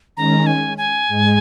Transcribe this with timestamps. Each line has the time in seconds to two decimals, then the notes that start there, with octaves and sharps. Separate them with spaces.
0.16 D#3 G#3 C#4 A#5
0.46 G#5
0.78 G#5
1.08 G#2 G#3